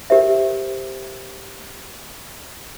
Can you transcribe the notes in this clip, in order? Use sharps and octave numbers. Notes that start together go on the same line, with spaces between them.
G4 A#4 C5 E5